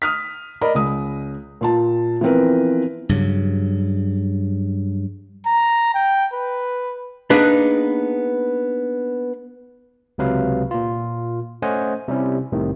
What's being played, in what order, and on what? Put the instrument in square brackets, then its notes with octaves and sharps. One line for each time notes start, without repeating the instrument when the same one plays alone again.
[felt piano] D#6 F6 B6
A#4 D5 D#5 B5
C#2 D#6
A#2 F4 A5
E3 F3 B3 C4 A#4 B4
[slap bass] G2 C#3 F#3
[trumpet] A#5
G5
B4
[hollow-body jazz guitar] A#3 B3 D4 D#4 G#4 B4
[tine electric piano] C#2 C3 F#3 B4 F5
A#2 F4
A3 C#4 C5 D#5 F#5 G#5
C3 G3 C#4 E4
C2 A2 C3 D#3